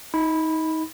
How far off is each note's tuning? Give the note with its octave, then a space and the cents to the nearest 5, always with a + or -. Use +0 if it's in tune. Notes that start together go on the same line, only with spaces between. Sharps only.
D#4 +25 B5 +0